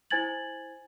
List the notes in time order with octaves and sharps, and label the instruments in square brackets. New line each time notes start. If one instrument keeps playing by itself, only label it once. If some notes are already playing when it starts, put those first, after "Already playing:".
[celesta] E4 C5 G#5 G#6 A6 F#7